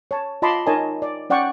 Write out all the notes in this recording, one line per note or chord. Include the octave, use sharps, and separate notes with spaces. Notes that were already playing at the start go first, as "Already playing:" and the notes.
C#5 A5
F4 D#5 A5 B5 C6 D6
D#4 A#4 C#5 D#5 G#5 A5
D5
C#4 D5 F#5 G5 C#6